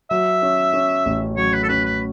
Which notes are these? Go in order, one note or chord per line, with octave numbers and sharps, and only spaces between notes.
F#3 E5
C#4
C#4
A1
F#3 C#5
B4
A4
C#4 B4
B4